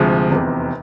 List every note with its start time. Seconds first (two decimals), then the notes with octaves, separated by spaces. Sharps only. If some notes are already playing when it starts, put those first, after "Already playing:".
Already playing: D2 C3 F3 G#3
0.30 F1 E2 C3